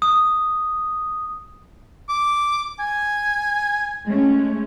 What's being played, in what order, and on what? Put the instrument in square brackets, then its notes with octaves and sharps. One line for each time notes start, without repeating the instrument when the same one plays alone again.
[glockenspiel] D#6
[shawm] D6
G#5
[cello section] G#3 A3 C#4